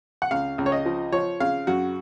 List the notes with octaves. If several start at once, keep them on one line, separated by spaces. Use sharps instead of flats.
F#5
C#2 F5
C#2
C#5
D#5
F3
F3 C#5
C#3 F5
F#2 F#4